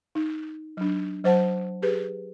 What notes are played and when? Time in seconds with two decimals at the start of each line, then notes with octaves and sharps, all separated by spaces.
0.15 D#4
0.77 F#3 D4
1.24 F#3 C5 F#5 A5
1.82 G4 G#4 B4